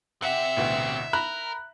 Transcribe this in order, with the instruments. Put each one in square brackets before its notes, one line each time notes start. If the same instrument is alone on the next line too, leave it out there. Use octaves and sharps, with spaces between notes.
[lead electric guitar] C4 G4 [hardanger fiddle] E5 [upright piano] F#5
[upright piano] A1 D2 B2
[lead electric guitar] A#4 [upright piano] A#5 B5 F#6